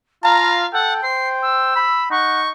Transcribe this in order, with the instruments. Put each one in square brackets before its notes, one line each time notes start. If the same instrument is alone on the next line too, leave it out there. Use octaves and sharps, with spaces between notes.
[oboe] F4 [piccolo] F5 [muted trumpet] A#5
[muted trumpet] A4 [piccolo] F#5 [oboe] G5
[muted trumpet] C5 [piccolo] C7
[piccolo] E6
[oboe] B5
[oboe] D#4 [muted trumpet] F#5 [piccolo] C#6